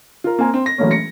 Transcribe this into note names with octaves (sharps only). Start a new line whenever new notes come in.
F4 A#4
A#3 C4 G#5 A#5
C4
A#6
E1 A1 F#3 A3 A#3 C#4
A#6 C#7